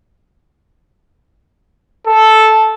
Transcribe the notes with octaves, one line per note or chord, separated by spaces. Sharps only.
A4